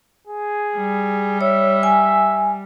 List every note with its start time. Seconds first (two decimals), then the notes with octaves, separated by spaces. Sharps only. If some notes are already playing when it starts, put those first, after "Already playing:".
0.27 G#4
0.76 G3
1.41 C#5 E5
1.83 G#5